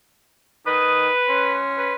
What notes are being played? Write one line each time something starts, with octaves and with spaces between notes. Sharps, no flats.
D#3 B4 D#5 D#6
C#4 C6
B4